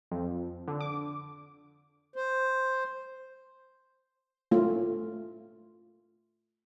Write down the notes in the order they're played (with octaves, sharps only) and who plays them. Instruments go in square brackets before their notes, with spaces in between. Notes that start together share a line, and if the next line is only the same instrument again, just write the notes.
[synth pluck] F2
D3
D6
[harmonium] C5
[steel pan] A3 F4